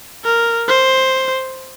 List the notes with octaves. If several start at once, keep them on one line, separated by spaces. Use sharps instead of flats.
A#4
C5